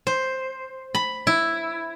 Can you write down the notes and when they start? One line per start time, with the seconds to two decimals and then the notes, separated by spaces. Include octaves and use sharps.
0.07 C5
0.95 B5
1.27 E4